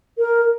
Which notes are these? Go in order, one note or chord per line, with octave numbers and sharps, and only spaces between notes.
A#4